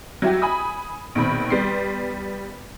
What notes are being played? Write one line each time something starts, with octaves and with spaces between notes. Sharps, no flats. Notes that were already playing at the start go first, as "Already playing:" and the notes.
F#3 E4 F#4 G4
G#5 B5 D#6
A#1 B2 D#3 C4 B5
G3 B3 C6 G6 C7